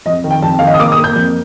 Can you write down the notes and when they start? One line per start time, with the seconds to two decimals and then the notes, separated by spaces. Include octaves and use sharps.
0.06 F2 D#5
0.24 D#3
0.31 G5
0.42 F2 A5
0.59 D#3 F5
0.67 D#5
0.74 D#6
0.79 A#3 D6
0.92 D#6
0.98 A#3
1.04 G6
1.16 F2